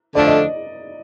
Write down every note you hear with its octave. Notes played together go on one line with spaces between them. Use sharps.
D3 F3 A3 D4 D5
D#5